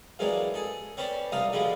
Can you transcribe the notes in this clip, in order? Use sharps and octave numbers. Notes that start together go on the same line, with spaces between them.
E3 F#3 G#3 A#3 C4 D4
G#4 A4
C4 C#4 B4 C5 D5
C2 D4 D#4 F5 A#5 D#6
B2 D3 F3 G#3 B3 C4